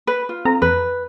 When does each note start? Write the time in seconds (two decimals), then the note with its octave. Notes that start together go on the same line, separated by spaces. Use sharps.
0.07 B4
0.29 F4
0.45 C4 A4 A#5
0.62 F2 B4